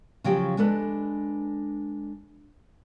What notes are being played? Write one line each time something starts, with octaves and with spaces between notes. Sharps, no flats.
C#3 F3 F#3 G4 G5
G#3 D4 A4 B4